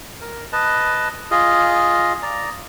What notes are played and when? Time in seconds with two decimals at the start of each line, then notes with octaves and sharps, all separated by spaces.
0.21 A#4
0.52 B4 D#5 A5
1.31 F4 G#4 D#5
2.23 D5 A#5